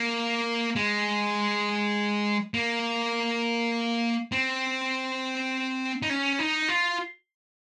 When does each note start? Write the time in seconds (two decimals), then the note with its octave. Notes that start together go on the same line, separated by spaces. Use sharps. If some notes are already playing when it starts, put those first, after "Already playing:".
Already playing: A#3
0.76 G#3
2.54 A#3
4.32 C4
6.02 D#4
6.10 C#4
6.39 D#4
6.69 F4